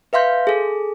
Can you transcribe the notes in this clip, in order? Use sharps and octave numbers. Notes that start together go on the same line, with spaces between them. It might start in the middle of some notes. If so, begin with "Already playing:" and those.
B4 E5 F5 C6 G6
G#4 A4